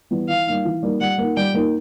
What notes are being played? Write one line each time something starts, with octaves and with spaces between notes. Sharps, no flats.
E3 G3 B3
E3 F5
G3 A#3 D#4
E3
G3 A#3 D#4
G3 F#5
A#3 D#4
G3 G5
A#3 D#4